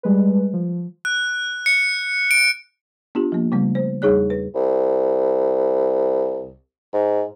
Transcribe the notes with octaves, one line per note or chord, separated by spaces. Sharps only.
G3 G#3 B4
F3
F#6
C#7
D7
B3 D4 F4 G4
F3 A#3
C#3 G3 A3 B3
C5
E2 G3 D#4 G#4 C#5 F#6
B4
C2
G#2